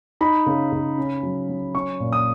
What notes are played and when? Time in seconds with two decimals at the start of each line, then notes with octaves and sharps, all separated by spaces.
0.21 D#4 B5
0.46 C#3
0.72 C#3
0.98 C#4
1.23 F#3
1.49 F#3
1.74 C#4 C#6
2.00 A#2
2.13 D#6